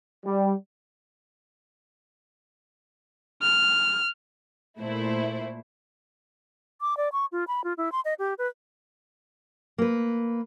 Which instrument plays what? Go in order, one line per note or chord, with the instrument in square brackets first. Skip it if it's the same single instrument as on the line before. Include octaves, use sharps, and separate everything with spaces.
[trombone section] G3
[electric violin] F6
[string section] A#2 A3 E4 C5
[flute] D6
D5
C#6
F4
B5
F4
E4
C6
D#5
G4
B4
[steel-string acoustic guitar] A#3 B4